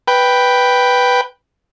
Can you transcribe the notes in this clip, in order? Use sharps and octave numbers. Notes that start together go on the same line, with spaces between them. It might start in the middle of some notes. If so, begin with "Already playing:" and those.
B4 G5